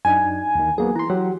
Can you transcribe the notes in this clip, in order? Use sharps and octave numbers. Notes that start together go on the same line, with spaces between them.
F#2 D4 D#4 G#5
D#2 D#3
F#3 A#3 B3 G#4
E3 A#5 C6
F#3 G4 F#5